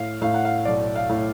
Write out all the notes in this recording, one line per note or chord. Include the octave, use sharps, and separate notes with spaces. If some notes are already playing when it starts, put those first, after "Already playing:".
Already playing: A2 F5
A2 F5
F#5
F5
B1 D5
F5
A2